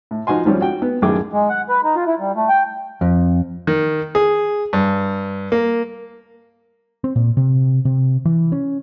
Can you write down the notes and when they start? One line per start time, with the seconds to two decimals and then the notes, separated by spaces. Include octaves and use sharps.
0.11 A2
0.27 F3 D#4 F#4 G#5 C6
0.45 G#1 F3 G3 C4 C#4
0.61 F#4 G5
0.82 B3
1.02 A1 F#2 D#3 G#4 G5 D6
1.33 G#3
1.49 F#5
1.69 B4
1.84 D#4
1.96 F4
2.07 E4
2.20 G3
2.36 A3
2.49 G5
3.01 F2
3.67 D#3
4.15 G#4
4.73 G2
5.52 A#3
7.04 C4
7.16 A#2
7.37 C3
7.85 C3
8.25 E3
8.52 C#4